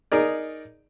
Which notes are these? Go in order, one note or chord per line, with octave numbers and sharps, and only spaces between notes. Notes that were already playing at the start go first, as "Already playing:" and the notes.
D#4 G#4 A#4 D5